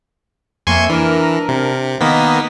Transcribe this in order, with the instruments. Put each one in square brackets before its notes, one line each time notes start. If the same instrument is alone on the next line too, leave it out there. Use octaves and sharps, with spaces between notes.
[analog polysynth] F2 A#3 E5 [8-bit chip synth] G#5 C6 C#6
[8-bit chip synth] E3 [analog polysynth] D4 A#4
[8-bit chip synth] C3
[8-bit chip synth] D#3 A#3 B3 [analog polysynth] D#5 B6